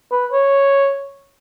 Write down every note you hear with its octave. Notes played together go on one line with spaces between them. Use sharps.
B4
C#5